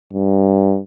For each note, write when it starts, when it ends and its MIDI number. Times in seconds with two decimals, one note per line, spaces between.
0.13 0.79 43